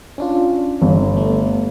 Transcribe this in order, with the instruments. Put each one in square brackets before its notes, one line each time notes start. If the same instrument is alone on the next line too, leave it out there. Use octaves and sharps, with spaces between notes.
[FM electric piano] C#4 D4 F4
[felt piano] G1
[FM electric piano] A3